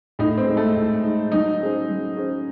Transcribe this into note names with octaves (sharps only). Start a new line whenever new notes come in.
A2 D#4
C4
G#3 D#4
A3
A2
G#3 D#4
F#3 D#4
C#4 G#4 C5
F#3
C#4 G#4 C5